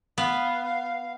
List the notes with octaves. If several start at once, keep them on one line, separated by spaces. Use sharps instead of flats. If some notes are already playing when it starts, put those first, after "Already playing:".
B3 F5